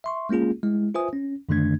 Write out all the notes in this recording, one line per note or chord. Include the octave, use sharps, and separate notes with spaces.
E5 C6 C#6
G#3 A#3 C#4 F4 G#4
G#3 E4
F4 B4 C5 E5 G#5 D#6
C#4
F#2 D3 D#3 A3 D4 G#6